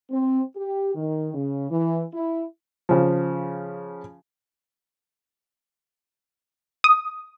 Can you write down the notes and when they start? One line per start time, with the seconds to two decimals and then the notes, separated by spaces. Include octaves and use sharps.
0.11 C4
0.57 G4
0.95 D#3
1.34 C#3
1.70 E3
2.14 E4
2.89 C#3 F3
6.84 D#6